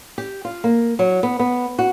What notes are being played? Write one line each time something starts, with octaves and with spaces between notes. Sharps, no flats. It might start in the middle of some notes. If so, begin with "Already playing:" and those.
G4
F4
A#3
F#3
B3
B3
F#4